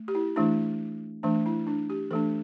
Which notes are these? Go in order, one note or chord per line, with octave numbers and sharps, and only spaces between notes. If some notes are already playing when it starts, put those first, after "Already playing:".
Already playing: A3
G4
E4
E3 A3 D4 E4
E3 A3 D4
E4
D4
G4
E3 A3 D4 A4